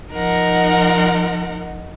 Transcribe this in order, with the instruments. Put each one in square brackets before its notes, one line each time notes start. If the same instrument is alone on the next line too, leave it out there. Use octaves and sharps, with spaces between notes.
[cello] F3 D#4 [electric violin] A#4 F#5